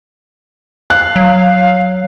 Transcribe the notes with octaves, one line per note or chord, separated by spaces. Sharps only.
F5 F#6
F#3